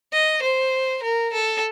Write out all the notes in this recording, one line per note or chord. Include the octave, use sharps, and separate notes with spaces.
D#5
C5
A#4
A4